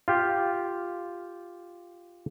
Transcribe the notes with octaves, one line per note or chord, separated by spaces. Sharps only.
F4 G4